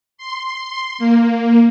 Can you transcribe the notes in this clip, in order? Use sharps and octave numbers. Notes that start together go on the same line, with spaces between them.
C6
A#3